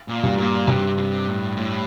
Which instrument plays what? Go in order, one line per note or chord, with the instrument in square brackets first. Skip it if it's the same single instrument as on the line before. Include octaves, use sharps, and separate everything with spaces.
[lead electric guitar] A#2
[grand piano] G2
[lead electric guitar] A#2
[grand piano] G2 [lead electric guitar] C3
[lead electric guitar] C3
A2
A2